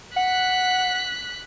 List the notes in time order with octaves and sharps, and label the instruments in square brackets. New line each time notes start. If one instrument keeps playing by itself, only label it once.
[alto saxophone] F#5 [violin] F#6 B6